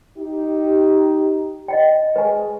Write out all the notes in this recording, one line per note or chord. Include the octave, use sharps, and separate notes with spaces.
D#4 G4
D#5 F#5 G5
G#3 B4 G#5